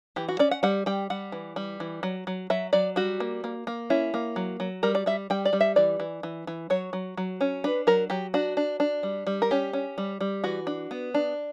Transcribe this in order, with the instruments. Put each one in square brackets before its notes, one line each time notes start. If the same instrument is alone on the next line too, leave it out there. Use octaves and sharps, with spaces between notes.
[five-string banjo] E3 G4
F#4
C#4 D5
F#5
G3 F#5
G3 G5
G3 F#5
E3
G3
E3
F#3
F#3
F#3 E5
F#3 D5
G3 F#4
A#3
A#3
A#3
C#4 E4
A#3
F#3
F#3
G3 A#4
D5
G3 E5
G3 G5
D5
G3
E5
E3 D5
E3
E3
E3
F#3 C#5
F#3
F#3
C#4
D4 B4
F#3 A#4
F#3 G4
D4 F#4
D4
D4
G3
G3
A#4
C#4 G4
C#4
G3
G3
E3 F#4
D4
B3
D4